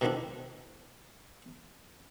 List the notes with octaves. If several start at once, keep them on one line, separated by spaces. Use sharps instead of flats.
B2 D3 D#3 F3 D4 E4